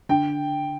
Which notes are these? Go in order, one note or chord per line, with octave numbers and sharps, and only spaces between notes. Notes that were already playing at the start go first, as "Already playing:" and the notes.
D3 G5